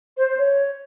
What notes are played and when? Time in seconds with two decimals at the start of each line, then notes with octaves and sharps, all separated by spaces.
0.16 C5
0.27 C5
0.37 C#5